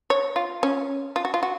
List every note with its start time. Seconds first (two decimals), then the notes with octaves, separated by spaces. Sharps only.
0.10 C#5
0.36 F4
0.63 C#4
1.16 F4
1.25 F#4
1.34 F4
1.43 F#4